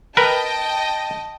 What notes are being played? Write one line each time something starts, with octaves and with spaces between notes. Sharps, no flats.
A#4 B4 D#5 G5 A5